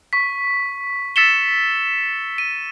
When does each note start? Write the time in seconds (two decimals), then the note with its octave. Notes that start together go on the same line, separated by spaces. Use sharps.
0.13 C#6 B6
1.16 E6 A6 B6 C#7 E7 G7
2.38 D#7